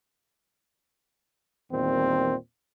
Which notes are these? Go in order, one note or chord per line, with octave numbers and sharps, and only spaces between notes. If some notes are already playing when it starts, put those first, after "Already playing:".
E2 A#2 D#3 G3 C4